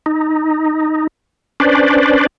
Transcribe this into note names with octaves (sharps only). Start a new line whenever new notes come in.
D#4
C#4 D4 B4 C5 D5